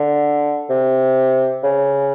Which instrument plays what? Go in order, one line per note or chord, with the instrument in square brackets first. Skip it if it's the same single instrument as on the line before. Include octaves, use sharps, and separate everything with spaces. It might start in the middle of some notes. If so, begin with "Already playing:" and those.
Already playing: [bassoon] D3
C3
C#3